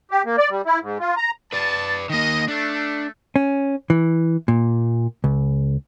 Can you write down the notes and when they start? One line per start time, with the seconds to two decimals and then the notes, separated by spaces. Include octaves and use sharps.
0.11 G4
0.25 A#3
0.38 D5
0.50 G3
0.66 E4
0.82 G#2
1.00 F4
1.17 A#5
1.53 B4 D5 A5
2.10 D#3 A#3 D#5
2.48 A3 D4
3.36 C#4
3.90 E3
4.48 A#2
5.24 C#2